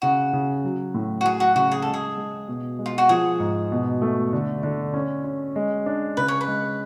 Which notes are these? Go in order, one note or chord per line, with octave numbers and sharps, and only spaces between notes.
C#3 F#4
C#3
F#3
A2
F#4
F#3 G#4
F#4
C#3 F#4
G#4
G#3 A4
G#4
G#3
B2
G#3
F4
F#4
F3 G#4
G#2
B2
A3
D3
D3
C#4
C#4
G#3
D4
C#3 B4
C#5
B4
G#3